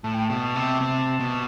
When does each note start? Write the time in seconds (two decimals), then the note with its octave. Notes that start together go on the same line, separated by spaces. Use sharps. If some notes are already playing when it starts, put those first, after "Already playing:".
0.04 A2 A5
0.14 G5
0.25 B2 A5
0.55 C3
0.81 C3
1.20 B2